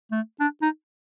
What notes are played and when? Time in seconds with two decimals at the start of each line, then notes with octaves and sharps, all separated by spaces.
0.12 A3
0.40 D4
0.62 D#4